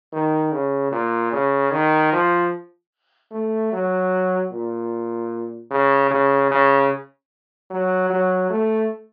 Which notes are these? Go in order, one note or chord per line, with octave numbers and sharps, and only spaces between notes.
D#3
C#3
A#2
C#3
D#3
F3
A3
F#3
A#2
C#3
C#3
C#3
F#3
F#3
A3